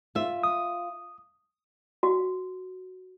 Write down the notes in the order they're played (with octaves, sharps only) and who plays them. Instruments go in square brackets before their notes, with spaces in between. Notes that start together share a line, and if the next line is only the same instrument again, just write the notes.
[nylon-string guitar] F4 E5
[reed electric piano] D#6
[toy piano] F#4